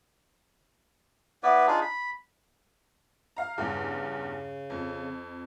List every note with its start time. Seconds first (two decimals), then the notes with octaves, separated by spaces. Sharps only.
1.43 B3 E4 B4 D5
1.67 D4 D#4 F4 G#4
1.82 B5
3.37 F5 A#5
3.58 E2 G2 C#3
4.70 F2